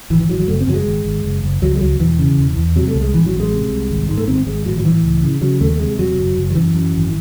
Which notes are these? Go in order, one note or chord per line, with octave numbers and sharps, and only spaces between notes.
G#1 E3
E3
G#1 F#3
F#3
F#1 A3
C4
F#1 F#3
G#3
G#1
G#1
F#1
F#1
C#2 F#3
G#3
C#2 F#3
E1 E3
C#3
E1
E2
C3 F#3
A3
C2
G#3
A1 E3
F#3
A1
G#3
C3
C2
G#1
G#2
A3
G#1 C4
G#1 G#3
A2 F#3
F#3
A2 E3
C#2
C#3
C#3 F#3
D#2 A3
A3
C3 G#3
E1 F#3
F#1
F#1
F#3
F#2 E3
F#2
G#1